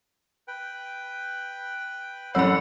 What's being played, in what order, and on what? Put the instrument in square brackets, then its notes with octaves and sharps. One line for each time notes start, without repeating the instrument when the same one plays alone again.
[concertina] B4 G5
[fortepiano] A1 F#2 E6 [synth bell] C#5 B5 [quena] F#5